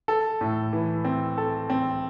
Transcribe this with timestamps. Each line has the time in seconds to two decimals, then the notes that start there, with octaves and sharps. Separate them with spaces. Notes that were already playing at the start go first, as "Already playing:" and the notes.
0.08 A4
0.41 A2
0.73 E3
1.05 C4
1.38 A4
1.70 C4